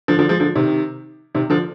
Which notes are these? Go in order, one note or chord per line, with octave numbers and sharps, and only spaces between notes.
D3 F3
D3 F3
F3 G#3
D3 F3
C3 D#3
C3 D#3
D3 F3